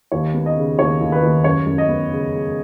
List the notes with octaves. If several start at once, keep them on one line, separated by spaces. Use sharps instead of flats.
D#2 C#5
B3
D#5
C#3
D#2 C#5
D#2
B4
D#2
F#2 C#5
F#2
D#5
B3
C#3
G#3